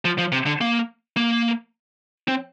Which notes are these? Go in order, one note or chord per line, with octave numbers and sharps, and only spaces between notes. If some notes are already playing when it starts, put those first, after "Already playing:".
F3
F3
C3
D3
A#3
A#3
C4